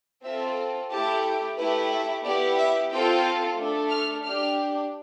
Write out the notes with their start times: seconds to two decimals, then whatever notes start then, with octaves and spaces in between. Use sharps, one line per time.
0.24 C4 F4 A4 E5
0.91 A3 E4 G4 A5
1.58 A3 E4 G4 B4
1.91 E5
2.24 B3 E4 G4 D5
2.58 E5
2.91 C4 F4 A4 G5
3.57 A3 D4 A4
3.90 F6
4.24 D4 G4 F6